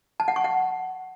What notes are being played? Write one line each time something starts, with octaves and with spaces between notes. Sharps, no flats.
A5
F#5
C#6
F#5